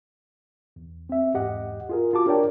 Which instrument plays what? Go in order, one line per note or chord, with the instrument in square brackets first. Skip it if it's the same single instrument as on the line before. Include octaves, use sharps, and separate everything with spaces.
[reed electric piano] E2
C4 E5
E2 G#2 G4 D#5 F#5
F4 G#4 A#4
F4 F#4 A5 D6
D4 G4 A#4 C#5 D5 G5